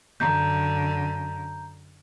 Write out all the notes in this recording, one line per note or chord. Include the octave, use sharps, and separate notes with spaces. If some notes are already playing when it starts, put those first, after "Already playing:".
F#2 D3 A#5 G6